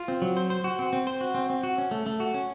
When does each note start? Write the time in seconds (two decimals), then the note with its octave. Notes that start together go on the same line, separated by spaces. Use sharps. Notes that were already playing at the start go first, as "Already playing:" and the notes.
Already playing: F4
0.08 C4
0.22 F#3
0.37 C5
0.50 C5
0.64 F#4
0.79 C4
0.93 C4
1.07 C5
1.21 F#4
1.35 C4
1.50 C4
1.63 F#4
1.78 C#4
1.91 A3
2.06 A3
2.20 F#4
2.34 C#4